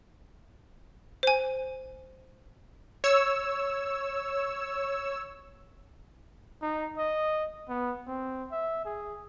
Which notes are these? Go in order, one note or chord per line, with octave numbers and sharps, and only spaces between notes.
C5 G#5
C#5 E6
D#4
D#5
B3
C4
E5
G#4